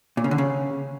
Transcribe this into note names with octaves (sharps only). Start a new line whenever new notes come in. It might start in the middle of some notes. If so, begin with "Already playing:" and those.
A#2
C#3
D3
C#3